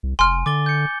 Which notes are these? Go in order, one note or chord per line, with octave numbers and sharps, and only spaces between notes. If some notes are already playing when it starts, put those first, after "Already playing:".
C2
F1 G#5 C6 F6
D3 D6 A6 G7
G6 C#7